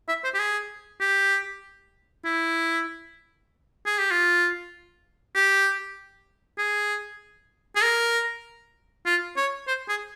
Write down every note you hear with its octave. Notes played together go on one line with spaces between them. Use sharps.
E5
C5
G4
G#4
G4
E4
G#4
G4
F4
G4
G#4
G#4
A#4
F4
C#5
C5
G#4